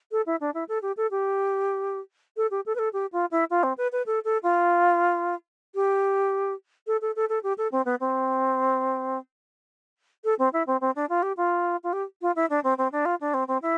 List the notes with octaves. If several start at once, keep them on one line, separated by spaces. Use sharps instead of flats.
A4
E4
D4
E4
A4
G4
A4
G4
A4
G4
A4
B4
A4
G4
F4
E4
F4
C4
B4
B4
A4
A4
F4
G4
A4
A4
A4
A4
G4
A4
C4
B3
C4
A4
C4
E4
C4
C4
D4
F4
G4
F4
F4
G4
F4
E4
D4
C4
C4
D4
F4
D4
C4
C4
E4